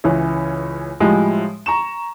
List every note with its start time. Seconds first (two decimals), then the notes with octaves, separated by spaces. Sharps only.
0.04 C#2 E3 C#4
1.00 A2 F3 G3 G#3
1.66 A#5 C#6 E7